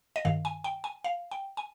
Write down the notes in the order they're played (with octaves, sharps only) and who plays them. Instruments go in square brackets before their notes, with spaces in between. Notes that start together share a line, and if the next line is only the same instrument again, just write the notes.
[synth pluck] D#5
G2 D#3 F5
G#5
G5
G#5
F5
G5
G#5